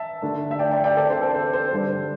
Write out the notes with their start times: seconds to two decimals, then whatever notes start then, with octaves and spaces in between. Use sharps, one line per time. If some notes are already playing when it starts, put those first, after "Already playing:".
Already playing: E5 A5
0.22 D3 A3 D4
0.51 E5
0.59 D5 G5
0.71 D5 G5
0.84 D5 G5
0.97 D3 C4 A4 D5
1.10 C5
1.21 A4
1.34 C5
1.53 C5
1.72 G2 D3 G3 D4